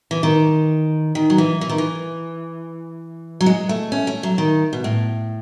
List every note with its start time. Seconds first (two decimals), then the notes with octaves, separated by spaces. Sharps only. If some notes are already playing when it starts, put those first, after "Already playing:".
0.11 E3
0.23 D#3
1.15 D#3
1.30 F#3
1.38 E3
1.61 E3
1.69 D#3
1.78 E3
3.40 F#3
3.46 G#3
3.69 A3
3.92 C#4
4.07 A3
4.23 F#3
4.38 D#3
4.73 B2
4.84 A2